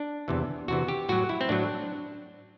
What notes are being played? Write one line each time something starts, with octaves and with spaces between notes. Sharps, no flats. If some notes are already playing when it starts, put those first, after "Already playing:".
Already playing: D4
E2 C3 E3
E2 C3 E3 F#4
G4
A2 F#3 F#4
E4
C4
A2 F#3 D4